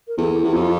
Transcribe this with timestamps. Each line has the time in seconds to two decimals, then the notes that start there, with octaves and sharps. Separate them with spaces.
0.08 A#4
0.18 E2 A4
0.34 A4
0.42 E2 G4
0.53 F2
0.63 F4